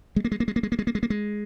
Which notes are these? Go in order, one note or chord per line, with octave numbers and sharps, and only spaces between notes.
G#3
A#3
G#3
A#3
G#3
A#3
G#3
A#3
G#3
A#3
G#3
A#3
G#3